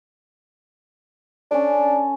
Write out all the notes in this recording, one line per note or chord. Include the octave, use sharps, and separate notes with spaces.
C#4 D4 A4